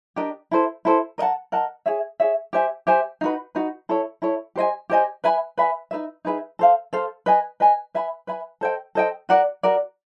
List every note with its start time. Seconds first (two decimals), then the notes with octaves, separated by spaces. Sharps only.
0.16 D4 G4 A#4 D#5
0.51 E4 A4 C5
0.85 E4 A4 C5
1.18 A#4 D#5
1.22 F#5 A5
1.52 A#4 D#5 F#5 A5
1.86 G#4 C#5 E5
2.20 G#4 C#5 E5
2.53 G4 C5 E5 G#5
2.87 G4 C5 E5 G#5
3.21 D#4 F#4 B4
3.55 D#4 F#4 B4
3.89 E4 A4 C#5
4.22 E4 A4 C#5
4.56 G4 C5 D#5 G#5
4.90 G4 C5 D#5 G#5
5.24 B4 E5 G#5 B5
5.57 B4 E5 G#5 B5
5.91 D#4 G#4 B4 E5
6.25 D#4 G#4 B4 E5
6.59 A4 C5 F5
6.93 A4 C5 F5
7.26 B4 D#5 G#5
7.60 B4 D#5 G#5
7.94 B4 E5 G#5 B5
8.27 B4 E5 G#5 B5
8.61 A4 C5 D#5 G5
8.95 A4 C5 D#5 G5
9.29 F#4 A#4 D5 F#5
9.63 F#4 A#4 D5 F#5